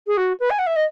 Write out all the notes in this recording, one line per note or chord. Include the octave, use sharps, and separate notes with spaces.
G#4
F#4
B4
G#5
F#5
E5
D#5